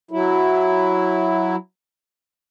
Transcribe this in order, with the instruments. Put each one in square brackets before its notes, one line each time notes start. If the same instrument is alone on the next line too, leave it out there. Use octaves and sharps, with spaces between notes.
[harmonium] F#3 E4